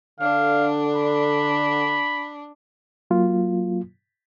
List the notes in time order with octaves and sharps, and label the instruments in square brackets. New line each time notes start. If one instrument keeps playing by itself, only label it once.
[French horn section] D3 [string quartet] D4 [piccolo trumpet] F5
[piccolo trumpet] B5
[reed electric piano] F#3 A#3 F4